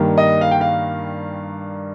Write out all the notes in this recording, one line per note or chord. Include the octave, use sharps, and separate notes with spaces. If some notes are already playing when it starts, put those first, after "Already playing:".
Already playing: G2 D#3 G3 A#3
D#5
F5
G5
F5